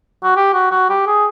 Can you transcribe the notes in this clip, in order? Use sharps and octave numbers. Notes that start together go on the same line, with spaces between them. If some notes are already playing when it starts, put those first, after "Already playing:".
F#4
G4
F#4
F#4
G4
G#4